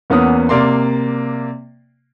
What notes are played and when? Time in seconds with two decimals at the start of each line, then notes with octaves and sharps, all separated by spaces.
0.10 E2 A#3 B3 C#4 D#6
0.49 C3 A#3 D5 C6